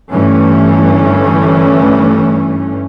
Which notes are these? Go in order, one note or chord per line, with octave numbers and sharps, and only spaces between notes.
G1 G2 E3 A3 C#4